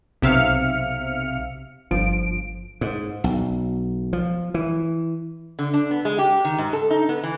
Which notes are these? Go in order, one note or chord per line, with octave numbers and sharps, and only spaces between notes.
B1 C3 E5 F5 F6 C#7
G1 F3 D7
G#2
B1
F3
E3
D3
D4
B3
G#3
G4
D#3
G#2
A4
D#4
B3
E3